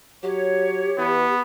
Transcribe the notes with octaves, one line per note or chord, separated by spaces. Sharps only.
F#3 G4 C#5
E3 B3